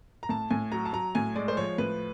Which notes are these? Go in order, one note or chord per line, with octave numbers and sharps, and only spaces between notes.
A#5
A2 A5
A2 G#5
F#3 A#5
A5
F#3 A#5
A2 G#5
G#3 D5
C5
F3 C#5
A2 B4